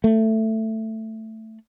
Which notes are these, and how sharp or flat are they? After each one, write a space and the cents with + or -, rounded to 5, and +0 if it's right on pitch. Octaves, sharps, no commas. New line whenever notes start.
A3 +10